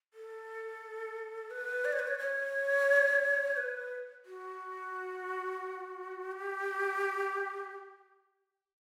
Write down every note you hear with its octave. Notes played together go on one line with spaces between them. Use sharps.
A4
B4
D5
C#5
B4
C#5
C#5
B4
F#4
G4